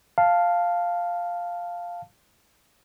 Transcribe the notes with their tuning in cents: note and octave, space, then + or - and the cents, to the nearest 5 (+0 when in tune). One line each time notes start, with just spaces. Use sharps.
F5 +0 A5 +0